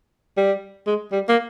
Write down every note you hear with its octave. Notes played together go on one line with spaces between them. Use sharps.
G3
G#3
G3
A#3